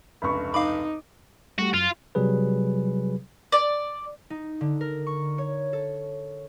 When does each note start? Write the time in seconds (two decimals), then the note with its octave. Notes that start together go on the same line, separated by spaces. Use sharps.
0.22 F1 C#2 G2 B5 C#6
0.54 D#4 F5 B5 D6
1.58 G3 A3 F#4 G4
1.74 F#2 F4
2.15 C3 F#3 G3 G#4 B4
3.52 D5
4.30 D#4
4.61 D3
4.81 A#4
5.07 C#6
5.38 C#5
5.73 A4